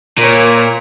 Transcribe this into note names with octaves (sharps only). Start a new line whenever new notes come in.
A#2 A#4 C#5